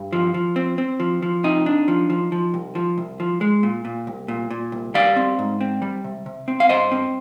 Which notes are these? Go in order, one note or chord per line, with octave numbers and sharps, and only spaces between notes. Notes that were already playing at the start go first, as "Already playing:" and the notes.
Already playing: G2
F3
F3
C4
C4
F3
F3
C3 D#4
D4
F3
F3
F3
C2
F3
C2
F3
G#3
A#2
A#2
C2
A#2
A#2
C2
G3 D5 F5
C4
G#2
C4
G3
C3
C3
C4
F5
G2 C5 D#5
C4